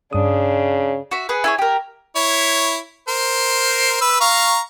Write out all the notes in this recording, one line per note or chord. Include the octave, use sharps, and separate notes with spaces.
G2 C#3 D4 D#6
F#4 E5
G#4 B4 F#5
E4 G#4 C#5
G4 A#4
E4 C#5
A#4 C5
B4 E6
F5 A#5 C#6